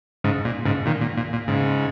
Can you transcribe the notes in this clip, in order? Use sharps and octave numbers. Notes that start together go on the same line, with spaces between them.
G#2 C#3
A#2
G#2 C#3
A#2 D#3
A#2
A#2
A#2
G#2 C#3